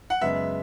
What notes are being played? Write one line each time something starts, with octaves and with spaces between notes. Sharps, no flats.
F#5
F#2 C#3 G#3 B3 E5